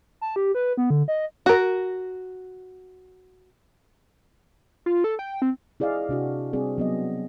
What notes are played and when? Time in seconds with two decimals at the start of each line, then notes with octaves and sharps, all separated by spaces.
0.21 A5
0.36 G4
0.55 B4
0.77 B3
0.90 D3
1.08 D#5
1.46 F#4 A#4
4.86 F4
5.04 A4
5.19 G5
5.42 C4
5.80 E4 G#4 D5 D#5 F5
6.09 C3 D4 F#4
6.53 G3 C4 G#4 D5
6.78 F#3 B3 D#5